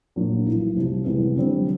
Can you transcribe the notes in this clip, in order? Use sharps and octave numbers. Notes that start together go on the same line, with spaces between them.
A#1 A#2 F#3 A#3 D4
B1 A2 E3
C2 C3 F3
C2 C3 E3 G#3 B3
F#2 D3 G3 C4